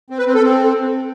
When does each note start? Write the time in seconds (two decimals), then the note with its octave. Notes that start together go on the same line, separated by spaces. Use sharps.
0.10 C4
0.18 B4
0.27 C4
0.35 A4
0.43 C4